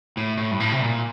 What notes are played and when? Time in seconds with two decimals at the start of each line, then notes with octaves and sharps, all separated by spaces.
0.17 A2
0.38 A2
0.51 G2
0.60 A2
0.72 C3
0.80 A#2